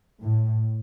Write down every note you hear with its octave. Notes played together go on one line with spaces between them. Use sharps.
A2